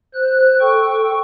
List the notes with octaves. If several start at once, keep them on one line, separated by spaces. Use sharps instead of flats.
C5 F#6
A4 G5 C#6